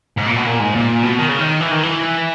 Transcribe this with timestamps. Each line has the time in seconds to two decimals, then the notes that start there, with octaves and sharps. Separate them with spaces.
0.18 G#2
0.27 A#2
0.37 B2
0.47 A#2
0.60 G#2
0.75 A#2
1.03 B2
1.18 D#3
1.29 C#3
1.38 D#3
1.60 E3
1.72 D#3
1.83 E3